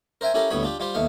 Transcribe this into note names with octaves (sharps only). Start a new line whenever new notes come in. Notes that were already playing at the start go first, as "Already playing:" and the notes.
A#4 C5 E5 G5 G#5
C#4 E4 G4 A4 A#4
D2 A2 G3 B3 C#5 B5
D4 F4 G4
G3 F4 G4 C5
D#2 B2 A3 F5